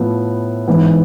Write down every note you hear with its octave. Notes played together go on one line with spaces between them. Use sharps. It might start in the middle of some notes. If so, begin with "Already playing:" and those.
Already playing: A2 F3 B3
G#2 E3 B3